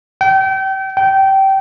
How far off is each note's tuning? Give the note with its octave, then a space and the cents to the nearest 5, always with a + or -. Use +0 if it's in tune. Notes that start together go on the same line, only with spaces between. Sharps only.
G5 -30
G5 -20